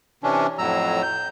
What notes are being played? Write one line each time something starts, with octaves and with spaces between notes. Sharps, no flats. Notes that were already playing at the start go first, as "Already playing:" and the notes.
C3 E3 C#4 D4
F2 A2 F#3 A#5 E6
G6